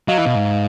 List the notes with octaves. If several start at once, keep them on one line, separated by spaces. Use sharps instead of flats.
F#3 D#5 F5
E3
B2
G#2